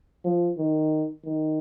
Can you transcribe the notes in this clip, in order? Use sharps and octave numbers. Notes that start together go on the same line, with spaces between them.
F3
D#3
D#3